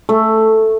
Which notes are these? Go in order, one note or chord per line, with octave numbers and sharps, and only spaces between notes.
A3